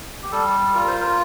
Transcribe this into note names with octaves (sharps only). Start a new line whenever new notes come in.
G4
G3 A4
F4 A#4
C5
A#4